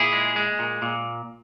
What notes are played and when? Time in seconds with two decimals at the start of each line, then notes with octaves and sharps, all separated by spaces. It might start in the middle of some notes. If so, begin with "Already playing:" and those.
Already playing: A#2 E4 G#4
0.13 G#3
0.36 G#3
0.59 A#2
0.82 A#2